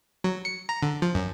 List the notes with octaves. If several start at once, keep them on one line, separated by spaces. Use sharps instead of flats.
F#3
C#7
A#5
D3
F3
F#2